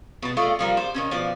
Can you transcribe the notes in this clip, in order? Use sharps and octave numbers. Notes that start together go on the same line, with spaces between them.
B2 A5
A3 F4 D5 D#5
F3 G3 A#3
C5 D5
D#3 E3 C#4
B2 F3 D5